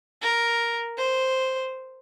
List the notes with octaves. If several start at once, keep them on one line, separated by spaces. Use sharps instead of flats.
A#4
C5